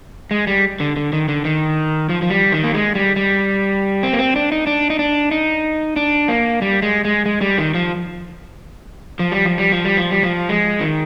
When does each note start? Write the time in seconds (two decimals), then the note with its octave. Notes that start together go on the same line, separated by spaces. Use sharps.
0.31 G#3
0.47 G3
0.80 D3
0.96 D3
1.13 D#3
1.28 D3
1.45 D#3
2.09 F3
2.22 F3
2.30 G3
2.52 D#3
2.64 A#3
2.74 G#3
2.95 G3
3.16 G3
4.03 C4
4.13 A#3
4.19 C4
4.36 D4
4.52 D#4
4.67 D4
4.90 D#4
4.99 D4
5.31 D#4
5.96 D4
6.28 A#3
6.62 G3
6.82 G#3
7.05 G#3
7.26 G#3
7.41 G3
7.58 D#3
7.74 F3
9.19 F3
9.32 G3
9.45 F3
9.58 G3
9.72 F3
9.85 G3
9.97 F3
10.11 G3
10.23 F3
10.49 G#3
10.81 D#3